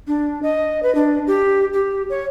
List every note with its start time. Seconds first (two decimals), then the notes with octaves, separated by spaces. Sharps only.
0.07 D4
0.43 D#5
0.83 B4
0.95 D4
1.27 G4
1.73 G4
2.10 C#5